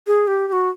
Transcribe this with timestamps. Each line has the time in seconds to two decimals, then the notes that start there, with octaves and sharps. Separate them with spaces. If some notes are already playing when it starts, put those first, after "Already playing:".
0.07 G#4
0.27 G4
0.48 G4
0.52 F#4